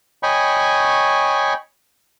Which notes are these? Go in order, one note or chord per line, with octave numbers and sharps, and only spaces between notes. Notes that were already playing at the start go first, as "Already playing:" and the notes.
C#5 D#5 G5 G#5 B5 C#6